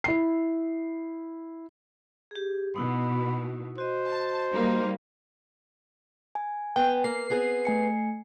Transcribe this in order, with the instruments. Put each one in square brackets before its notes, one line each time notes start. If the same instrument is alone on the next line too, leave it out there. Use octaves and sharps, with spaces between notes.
[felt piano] E4 C7
[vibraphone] G4 G#4
[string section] B2 [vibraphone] D#4 E4 F#4 [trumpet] B5
[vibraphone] F#4 D#5 [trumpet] C5
[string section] A5
G3 A#3 D#4
[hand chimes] G#5
[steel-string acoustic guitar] B3 [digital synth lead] G5
[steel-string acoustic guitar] A#3 [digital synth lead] C7
[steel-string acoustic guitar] B3 C4 G#4
[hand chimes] A3 G#5 C#7